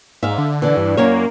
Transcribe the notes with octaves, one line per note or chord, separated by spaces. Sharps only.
G#2 E5 F5
D3
E3 D4
G2
F#2 A#3 C#4 C#5